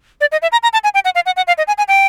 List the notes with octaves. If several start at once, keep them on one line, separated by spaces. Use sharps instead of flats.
D5
D#5
E5
A#5
A#5
A5
G#5
G5
F#5
F5
F#5
F#5
F5
D#5
G#5
G#5
G5